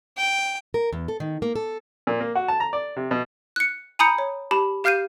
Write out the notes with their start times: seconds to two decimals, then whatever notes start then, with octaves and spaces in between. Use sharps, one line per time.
0.17 G5
0.74 A#4
0.93 E2
1.08 A4
1.20 D#3
1.42 A#3
1.55 A4
2.07 A#2
2.20 A#3
2.35 F#4
2.48 A5
2.60 A#5
2.73 D5
2.96 C3
3.11 B2
3.56 F#6 C#7
3.99 G#5 A#5 B5 D#6 G6 C#7
4.18 C#5
4.51 G4 A5 B5
4.84 G4 F5 F6 G6 C7 D#7